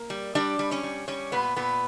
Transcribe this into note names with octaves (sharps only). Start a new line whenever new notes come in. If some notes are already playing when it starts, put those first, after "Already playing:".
Already playing: A#3 A#4
G3
G3 D4 D5
G3
C#4 C#5
G3
G3 C#4 C#5
A#2 B3 B4
A#2 B3 B4